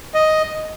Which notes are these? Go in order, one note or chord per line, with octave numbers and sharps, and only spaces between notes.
D#5